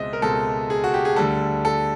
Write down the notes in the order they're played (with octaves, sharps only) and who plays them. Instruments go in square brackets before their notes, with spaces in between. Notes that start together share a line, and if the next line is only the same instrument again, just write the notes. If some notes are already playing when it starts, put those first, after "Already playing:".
Already playing: [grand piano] C#2 B2 G#3 C4 D#5 E5
A#4
C#2 B2 G#3 C4 A4
G#4
F#4
G4
G#4
D2 D3 G3 A4
A4